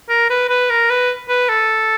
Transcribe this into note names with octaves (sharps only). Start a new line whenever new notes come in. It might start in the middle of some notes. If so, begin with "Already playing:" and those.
A#4
B4
B4
A#4
B4
B4
A4